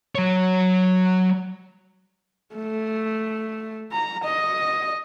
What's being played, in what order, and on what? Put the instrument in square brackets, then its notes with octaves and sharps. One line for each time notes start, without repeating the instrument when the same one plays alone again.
[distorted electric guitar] F#3 C#5
[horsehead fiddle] A3
A#5
D#5